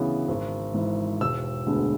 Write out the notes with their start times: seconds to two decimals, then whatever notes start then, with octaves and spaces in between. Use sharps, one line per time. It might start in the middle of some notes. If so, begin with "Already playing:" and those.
Already playing: D2 C#3 E3 B3
0.28 G#1
0.74 G#2 E3
1.21 E1 E6
1.67 D2 D3 G#3 B3